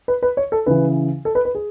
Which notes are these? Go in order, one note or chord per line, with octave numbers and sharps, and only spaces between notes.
B4
B4
C#5
A4
C#3 E3 B4
A4
B4
B4
G#4